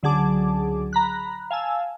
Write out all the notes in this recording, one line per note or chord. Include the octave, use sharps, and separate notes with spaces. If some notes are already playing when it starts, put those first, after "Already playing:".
C#2 D3 F#3 G#4 A5 D6
A#5 B5 F#6
F5 G#5 A5 E6